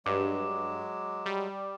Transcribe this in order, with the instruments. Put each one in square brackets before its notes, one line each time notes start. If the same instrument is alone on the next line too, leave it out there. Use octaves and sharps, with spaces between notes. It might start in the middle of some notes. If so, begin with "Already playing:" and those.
[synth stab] G2 [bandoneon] F#3 G#3 [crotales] D6
[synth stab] G3